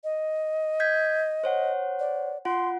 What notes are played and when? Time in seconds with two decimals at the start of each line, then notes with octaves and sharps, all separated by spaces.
0.04 D#5
0.80 G6 G#6 B6
1.44 C5 C#5 F#5
2.00 D5
2.45 F4 F#5 C6